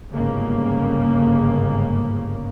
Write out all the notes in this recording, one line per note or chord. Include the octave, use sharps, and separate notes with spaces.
G1 G#2 C#3 A#3